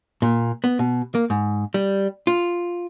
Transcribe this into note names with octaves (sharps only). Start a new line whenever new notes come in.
A#2
B3
B2
A#3
G#2
G3
F4